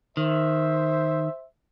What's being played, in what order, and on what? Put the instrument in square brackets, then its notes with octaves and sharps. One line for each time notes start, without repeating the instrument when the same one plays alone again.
[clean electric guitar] D#3 [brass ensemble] C5 E5